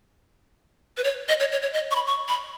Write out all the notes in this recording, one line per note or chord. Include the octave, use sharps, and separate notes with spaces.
B4
C#5
D#5
C#5
C#5
C#5
D#5
C#6
B5
C#6
B5